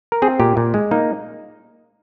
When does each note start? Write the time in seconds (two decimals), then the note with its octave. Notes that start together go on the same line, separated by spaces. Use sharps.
0.12 A#4
0.22 C4 G#4
0.40 A#2 G4
0.57 A#2
0.74 G#3
0.91 A#3 D#4